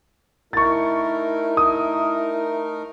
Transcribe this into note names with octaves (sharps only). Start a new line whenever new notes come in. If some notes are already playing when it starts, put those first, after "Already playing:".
A3 D#4 E4 A#4 C#6 A6
D#6